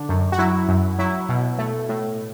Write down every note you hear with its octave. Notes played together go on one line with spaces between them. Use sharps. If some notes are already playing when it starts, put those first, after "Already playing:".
Already playing: D3 D4
F#2
F#4
F#3 E4
F#2
F#3 E4
B2
A3
A2